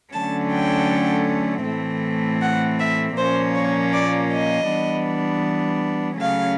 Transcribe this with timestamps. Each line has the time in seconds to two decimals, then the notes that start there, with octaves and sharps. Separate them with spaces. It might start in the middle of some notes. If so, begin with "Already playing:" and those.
0.13 D3 F#3 A3 C#4 A5
0.51 G5
1.65 A2 E3 A3 C4
2.41 F#5
2.79 E5
3.17 A#2 F3 A#3 C#4 C5
3.55 C#5
3.93 D5
4.31 D#5
4.69 E3 G3 B3 D4
6.21 C#3 F#3 A3 C#4 F5